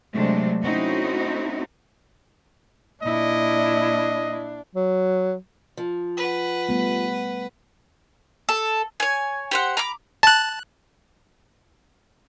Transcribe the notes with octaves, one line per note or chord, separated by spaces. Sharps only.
C3 F#3 G#3 A3 C4 D4
A3 C4 C#4 D#4 E4 F#4
A#2 D4 E4 D#5
F#3
F3
B4 F#5
G3 A3 B3
A4
C#5 G#5
G4 C5 F#5
A#5 B5 D6
A5 F#6